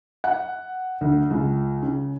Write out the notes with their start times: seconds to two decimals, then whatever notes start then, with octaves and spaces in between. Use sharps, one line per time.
0.24 F#5
1.01 D2
1.30 C#2
1.82 C#3